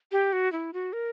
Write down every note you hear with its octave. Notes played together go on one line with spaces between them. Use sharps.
G4
F#4
E4
F#4
A#4